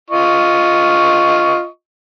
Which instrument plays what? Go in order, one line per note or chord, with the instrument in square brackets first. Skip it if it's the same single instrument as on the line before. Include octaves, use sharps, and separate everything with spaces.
[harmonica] F4 D#5 C#6